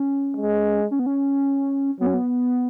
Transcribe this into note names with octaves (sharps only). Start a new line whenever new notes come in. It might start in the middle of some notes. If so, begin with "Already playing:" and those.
Already playing: C#4
G#3
C#4
B3
C#4
F#3 B3
C#4
B3